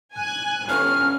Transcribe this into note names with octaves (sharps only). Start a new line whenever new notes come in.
G#5 F#6
G1 C#4 F6